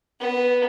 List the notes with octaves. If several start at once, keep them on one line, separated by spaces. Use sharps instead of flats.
B3